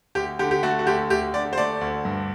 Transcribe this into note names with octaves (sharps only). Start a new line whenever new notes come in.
D2 G4
D3 G4
G4
A3 F#4
F#4
D2 G4
D2 G4
D3 D5
C5
A3 D5
D2
G2